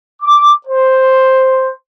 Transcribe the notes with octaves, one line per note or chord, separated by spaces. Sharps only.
D6
C5